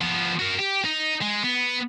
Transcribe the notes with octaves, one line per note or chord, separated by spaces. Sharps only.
F3 B3
F#4 A#4
G4
D#4
G#3
B3